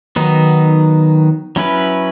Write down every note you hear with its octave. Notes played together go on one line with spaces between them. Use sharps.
D#3 F#3 B3 D#4
F#3 C#4 E4 B4